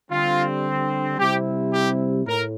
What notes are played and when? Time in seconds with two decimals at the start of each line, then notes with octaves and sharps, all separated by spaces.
0.11 D3 G3 C4 F4
1.19 C3 G3 C4 E4 G4
1.73 G4
2.27 A2 A#4